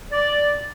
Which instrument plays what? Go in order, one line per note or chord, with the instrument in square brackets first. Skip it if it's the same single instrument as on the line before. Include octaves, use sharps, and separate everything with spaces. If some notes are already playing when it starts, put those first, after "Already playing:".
[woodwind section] D5